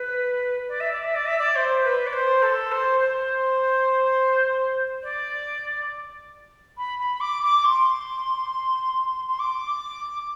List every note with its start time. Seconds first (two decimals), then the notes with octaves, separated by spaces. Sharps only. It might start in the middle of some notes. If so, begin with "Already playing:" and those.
Already playing: B4
0.68 D5
0.80 E5
0.92 D5
1.03 E5
1.15 D5
1.26 E5
1.38 D5
1.55 C5
1.84 B4
2.06 D5
2.12 C5
2.42 A4
2.71 C5
3.00 C5
5.02 D5
6.77 B5
6.99 B5
7.20 D6
7.42 D6
7.64 C6
9.27 C6
9.39 D6